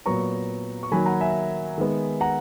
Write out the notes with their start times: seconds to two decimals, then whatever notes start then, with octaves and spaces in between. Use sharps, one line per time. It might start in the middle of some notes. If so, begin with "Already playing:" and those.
0.06 A#2 F#3 B3 A#5 C#6
0.83 C#6
0.91 D#3 F#3 A#3 G#5 B5
1.06 F#5 A#5
1.21 E5 G#5
1.78 D#3 G#3 B3
2.21 F#5 A#5